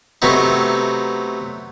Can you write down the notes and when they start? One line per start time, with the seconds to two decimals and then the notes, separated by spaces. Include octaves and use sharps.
0.22 C3 F#3 A3 B3 D#4